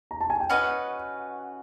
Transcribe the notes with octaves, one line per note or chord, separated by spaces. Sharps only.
A#5
A5
G#5
G5
C#4 F#4 B4 D#5 F#5